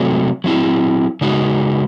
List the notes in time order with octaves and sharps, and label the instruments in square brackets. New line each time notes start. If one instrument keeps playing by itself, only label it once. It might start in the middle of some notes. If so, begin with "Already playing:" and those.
Already playing: [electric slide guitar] C3 F#3 A3
F#3 C4 E4
C#3 G#3 D#4 F#4